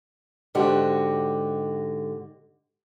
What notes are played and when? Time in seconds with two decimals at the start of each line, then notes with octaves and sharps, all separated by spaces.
0.55 G#2 D3 F#4 G4